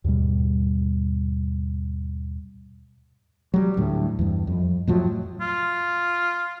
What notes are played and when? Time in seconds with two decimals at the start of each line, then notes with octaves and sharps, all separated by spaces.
0.04 D#2 G#2 B2 G3
3.54 F#3 G3
3.77 D2 A2
4.19 E2 G2
4.47 F2
4.87 F2 A2 F3 F#3
5.41 F4